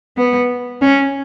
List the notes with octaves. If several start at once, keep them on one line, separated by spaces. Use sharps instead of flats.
B3
C#4